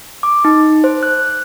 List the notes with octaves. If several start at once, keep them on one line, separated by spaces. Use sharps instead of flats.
D6
D#4
C5
F#6